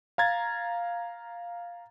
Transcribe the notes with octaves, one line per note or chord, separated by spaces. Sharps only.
F5 A#5 G#6 A6